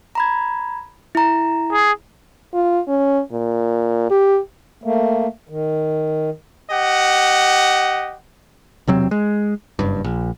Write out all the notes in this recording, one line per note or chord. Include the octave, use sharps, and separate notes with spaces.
A#5 B5 G#6
E4 A#5
G#4
F4
C#4
A#2
G4
A3 A#3
D#3
G4 D#5 F#5
E1 C3 F#3 C4
G#3
F#1 G2
A#1